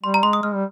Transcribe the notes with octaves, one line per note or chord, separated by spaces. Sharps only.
G3 C6
A#5
G#3 C6
D#6
G#3 F6
G3